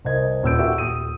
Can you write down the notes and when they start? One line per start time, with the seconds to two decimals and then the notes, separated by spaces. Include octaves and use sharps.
0.05 C2 A#4 C5 D#5 G#6
0.43 D#1 C#4 B4 E6 G6 D7
0.59 F#4 G4 A4 E5 F#5
0.78 D#1 D#6 D#7